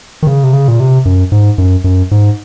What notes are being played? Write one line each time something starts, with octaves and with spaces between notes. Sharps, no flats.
D#3
C#3
C3
C#3
A#2
C3
F#2
G#2
F#2
F#2
G#2